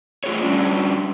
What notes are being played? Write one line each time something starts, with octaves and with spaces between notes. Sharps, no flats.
A3 F4 F#4 G#4 C5 C#5
G3 C#4 D4